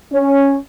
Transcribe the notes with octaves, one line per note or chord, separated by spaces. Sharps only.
C#4